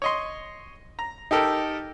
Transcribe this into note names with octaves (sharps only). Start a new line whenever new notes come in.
C#5 D#5 C6
A#5
D#4 G4 A4 A#4